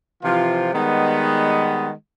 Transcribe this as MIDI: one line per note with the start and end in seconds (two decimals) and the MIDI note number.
0.23 0.71 48
0.23 0.71 52
0.23 0.71 53
0.23 0.71 65
0.72 1.90 51
0.72 1.90 55
0.72 1.90 56
0.72 1.90 59